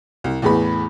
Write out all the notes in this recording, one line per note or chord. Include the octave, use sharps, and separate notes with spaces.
C2
E2 A2 B3 G#4 B5